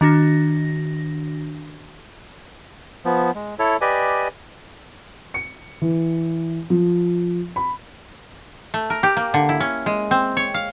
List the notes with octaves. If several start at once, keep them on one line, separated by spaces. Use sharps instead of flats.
D#3 D4 F#4 A#6
F3 B3
G#3
E4 A4 C#5
G4 B4 D5 D#5 G#5
C#7
E3
F3
B5
A3
A#4
G4
A#3
D3
E4
C#4
G#3
C4
C#5
F5